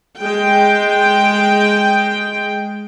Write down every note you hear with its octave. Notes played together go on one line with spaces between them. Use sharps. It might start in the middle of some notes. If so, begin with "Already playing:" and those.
G#3 G5